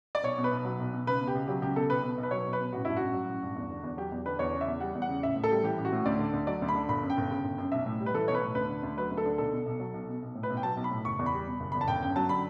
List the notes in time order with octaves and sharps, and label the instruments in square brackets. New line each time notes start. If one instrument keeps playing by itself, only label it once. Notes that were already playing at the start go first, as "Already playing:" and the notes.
[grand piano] D5
B1 C#5
B2
B4
B1
F#3
B1
B2
C#2 B4
B2
G4
C#2
F#3 G4
C#2 G4
B2 A4
B1 B4
B2
B1
B4
F#3 C#5
B1
B4
B2
A1 F#4
G2 E4
A1 F#4
F#3
A1
G2
E2
D3
E2
F#3 G4
E2
D3 B4
E2 C#5
C#3
E5
E2
G3 F#5
E2
F#5
C#3
A1 E5
A2
A4
G3
E3 G4
A1
F#4
A2
D2 D5
D3
D2
F#3 D5
D2
B5
D3
G1 B5
F#2
G5
G1
C#3
G1
F#2
B1 E5
A2
G3
B4
E3 A4
B1 C#5
B4
A2
D2 B4
D3
D2
F#3 B4
D2
A4
D3
B1 A4
B2
B1
F#3
B1
B2
B1
A2
B4
B1
G5
F#3 A5
B1
B5
A2
F#1 C#6
E2
B5
G3
B2
F#1
E2 B5
A5
G1 G5
F#2 G5
F#3 A5
D3 B5